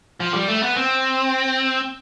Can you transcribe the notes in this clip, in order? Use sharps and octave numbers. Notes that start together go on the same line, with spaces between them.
F3
G3
A3
B3
C4